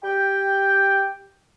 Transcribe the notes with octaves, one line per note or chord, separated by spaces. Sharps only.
G4 G5